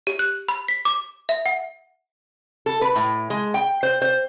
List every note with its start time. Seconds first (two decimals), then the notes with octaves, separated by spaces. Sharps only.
0.07 G4
0.19 F#6
0.48 B5
0.68 B6
0.85 D6
1.29 E5
1.46 F#5
2.66 A4
2.81 B4
2.96 A2
3.30 G#3
3.54 G5
3.83 C5
4.02 C5